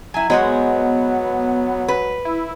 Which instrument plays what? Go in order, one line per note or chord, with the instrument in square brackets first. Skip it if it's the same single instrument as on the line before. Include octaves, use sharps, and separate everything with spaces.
[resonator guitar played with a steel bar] F#3 E4 [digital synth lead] G#5
[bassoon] F#3 [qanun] G#3 D#5 F#5 [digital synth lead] B3 [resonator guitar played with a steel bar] G#4 C5 C#5
[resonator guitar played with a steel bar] B4
[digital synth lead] E4